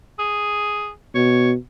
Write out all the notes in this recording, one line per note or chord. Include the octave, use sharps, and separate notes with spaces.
G#4
B2 C#5